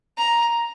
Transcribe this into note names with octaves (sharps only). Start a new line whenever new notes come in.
A#5